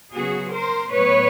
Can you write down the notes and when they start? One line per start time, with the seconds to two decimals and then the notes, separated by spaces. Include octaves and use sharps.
0.13 C#3 F#3 B3 F#4 G#4
0.52 A#4 C5
0.91 A2 F#3 B3 B4 C#5